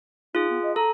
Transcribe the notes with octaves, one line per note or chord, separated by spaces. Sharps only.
D#4 F4 G#4
B3
D#5
A4 A#5